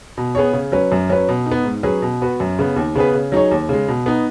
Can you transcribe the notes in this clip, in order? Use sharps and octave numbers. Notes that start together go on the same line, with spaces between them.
B2
B3 G#4 C#5
C#3
F#3 C#4 B4
F#2
F#3 C#4 B4
B2
D#4
B3
G#2
F#3 C#4 G#4 B4
B2
B3 F#4 B4
F#2
C#3 B3
D#2
C#3 B3 G#4 B4
C#3
F#3 D#4 G#4 C#5
D#2
C#3 G#3
B2
B3 D#4